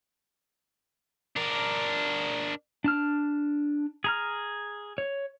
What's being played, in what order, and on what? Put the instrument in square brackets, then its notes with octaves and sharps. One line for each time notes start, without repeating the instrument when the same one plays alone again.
[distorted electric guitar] D4 A#4
[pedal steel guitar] D4 A5 F6
G#4 A#5 F6
C#5